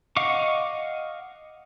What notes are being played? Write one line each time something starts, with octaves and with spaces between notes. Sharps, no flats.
D#5 F5 F#5 C#6 D6